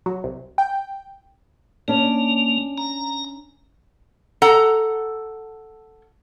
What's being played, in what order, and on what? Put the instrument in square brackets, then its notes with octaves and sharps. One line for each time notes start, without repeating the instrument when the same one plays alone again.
[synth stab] F#3
C2
G5
[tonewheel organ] A#3 [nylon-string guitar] C#4 D4
[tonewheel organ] A#5
[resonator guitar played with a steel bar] A4 F#5 A#5